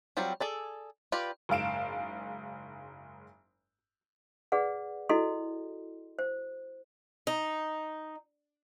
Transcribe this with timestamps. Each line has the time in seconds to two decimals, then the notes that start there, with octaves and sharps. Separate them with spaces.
0.17 F#3 G3 C4 F4 G4
0.40 G#4 A4 D5
1.12 F4 G4 B4 D5
1.49 F#1 G#2 F5 D7 E7
4.52 G#4 B4 D5 F#5
5.09 E4 F#4 A4 D#5 C6
6.19 C5
7.27 D#4